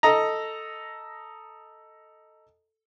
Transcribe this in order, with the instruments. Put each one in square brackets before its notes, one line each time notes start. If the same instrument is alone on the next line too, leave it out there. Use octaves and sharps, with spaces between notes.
[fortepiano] A4 D#5 A#5